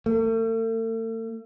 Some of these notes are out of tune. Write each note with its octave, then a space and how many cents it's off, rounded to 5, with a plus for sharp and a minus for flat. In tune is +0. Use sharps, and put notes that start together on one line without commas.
A3 +40